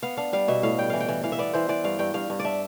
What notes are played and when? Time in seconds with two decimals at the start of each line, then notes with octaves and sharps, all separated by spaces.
0.03 B3 F5
0.17 D4 F5
0.33 G3 F5
0.48 B2 E5
0.63 A2 F5
0.78 G3 G5
0.90 E3 F5
1.00 G5
1.08 E3
1.23 E3 F5
1.32 E5
1.39 B3 D5
1.53 E3 C5
1.69 E3 D5
1.84 G2 F5
1.99 G2 G5
2.14 G2 F5
2.30 G2
2.40 D5
2.45 D4 E5